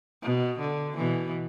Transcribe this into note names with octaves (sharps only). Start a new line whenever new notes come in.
B2
D3
B2 E3